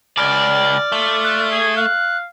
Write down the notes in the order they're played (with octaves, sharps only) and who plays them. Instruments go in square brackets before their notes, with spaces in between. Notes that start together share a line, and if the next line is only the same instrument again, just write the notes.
[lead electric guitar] C#2 [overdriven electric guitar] D5 [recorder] F6
[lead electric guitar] A3 [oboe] F4
[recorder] F#6
[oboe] G#4 [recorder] G#6
[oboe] F5 [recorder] F#6